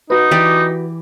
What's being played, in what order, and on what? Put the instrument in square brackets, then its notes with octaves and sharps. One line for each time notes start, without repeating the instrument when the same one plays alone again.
[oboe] D#4 [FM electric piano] F#4 B4
[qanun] E3 G4 D5